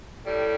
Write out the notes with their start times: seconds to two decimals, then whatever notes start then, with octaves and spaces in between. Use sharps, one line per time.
0.24 A2 G3